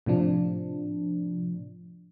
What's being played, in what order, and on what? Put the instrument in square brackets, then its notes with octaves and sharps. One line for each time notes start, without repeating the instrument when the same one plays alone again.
[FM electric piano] A2 C3 F3 D4